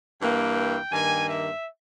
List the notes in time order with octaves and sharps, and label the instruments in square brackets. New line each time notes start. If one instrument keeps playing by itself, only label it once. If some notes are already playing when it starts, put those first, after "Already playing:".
[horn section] G2 E3 A#3 G5
G2 D#3 A#3 G#5
E5